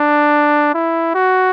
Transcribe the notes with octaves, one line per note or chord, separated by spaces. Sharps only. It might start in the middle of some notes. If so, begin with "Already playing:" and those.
Already playing: D4
E4
F#4